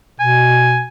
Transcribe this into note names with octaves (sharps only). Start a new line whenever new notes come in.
B2 G#5